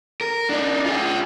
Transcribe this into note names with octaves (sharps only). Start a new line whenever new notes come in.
A#4
D4 D#4
F4 G#4